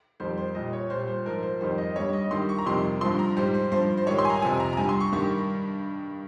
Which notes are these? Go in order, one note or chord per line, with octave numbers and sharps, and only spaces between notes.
F2 D#3 G3 C5
C5
A#2 G3 D#5
C#5
A#2 G3 C5
C5
G#2 F3 A#4
C5
F2 D#3 G3 C5
D#5
G2 G3 C#5
D#5
G2 D#3 G3 C6
C#6
A#5
F2 C3 D#3 G3 C6
G2 F3 C6
A#5
G#2 G3 C5
C5
G2 F3 C5
C5
G#2 D#3 G3 C#5
C6
G#5
A#5
F2 C3 F3 G#5
A#5
A#5
G2 G3 G#5
C6
C#6
G2 D#3 G3 C#6